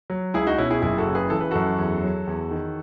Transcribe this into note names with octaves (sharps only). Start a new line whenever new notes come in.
F#3
C#2 E4 G#4
D#4 F#4
B2 C#4 E4
E4 G#4
F#1 E4 G#4
F#4 A4
C#3
G#4 B4
E3 A4
B4
F#2 F#4 A4
E2
F#3
E2
D#3